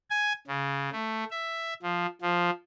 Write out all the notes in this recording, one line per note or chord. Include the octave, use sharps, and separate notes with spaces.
G#5
C#3
A3
E5
F3
F3